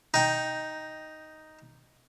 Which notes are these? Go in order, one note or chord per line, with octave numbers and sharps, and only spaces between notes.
D#4 G5